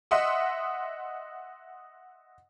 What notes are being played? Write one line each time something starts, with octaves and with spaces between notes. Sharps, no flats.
D#5 E5 F#5 C6 D#6